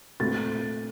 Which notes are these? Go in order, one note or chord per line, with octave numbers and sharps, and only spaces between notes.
A#2 A3 C4 A6